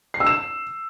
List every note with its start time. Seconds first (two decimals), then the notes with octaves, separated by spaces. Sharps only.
0.14 C7
0.20 E6
0.26 E7